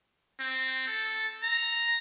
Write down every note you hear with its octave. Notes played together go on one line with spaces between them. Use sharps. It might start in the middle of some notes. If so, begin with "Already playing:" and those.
C4
A4
A#5